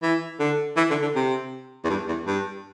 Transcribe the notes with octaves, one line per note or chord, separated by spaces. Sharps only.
E3
D3
E3
D3
D3
C3
E2
G2
E2
G2